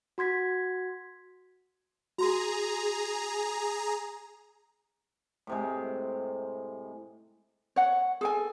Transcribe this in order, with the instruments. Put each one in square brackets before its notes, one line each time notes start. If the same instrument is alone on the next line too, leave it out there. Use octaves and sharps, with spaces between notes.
[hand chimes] F#4 C6 G#6 B6
[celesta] F#4 C6 [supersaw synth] G#4 A#5
[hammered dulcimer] A2 C3 G#3
[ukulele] C#5 F#5
G#4 A4 G#5